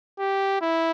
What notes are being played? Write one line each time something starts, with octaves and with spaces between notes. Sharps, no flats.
G4
E4